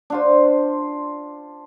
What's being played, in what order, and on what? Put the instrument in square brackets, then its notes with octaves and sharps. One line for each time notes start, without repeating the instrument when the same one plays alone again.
[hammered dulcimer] D4 F4 C5